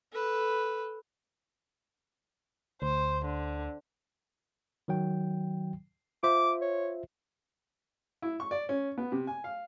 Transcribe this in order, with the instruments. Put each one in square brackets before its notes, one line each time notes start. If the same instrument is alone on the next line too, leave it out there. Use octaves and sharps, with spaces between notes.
[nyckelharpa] A4 B4
[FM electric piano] D2 [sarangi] C5
[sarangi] D3
[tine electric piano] D#3 F#3 G5
[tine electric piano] F4 C5 E5 [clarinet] D6
[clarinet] C#5
[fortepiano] E4
C#6
D5
C#4
B3
C3
G#5
F5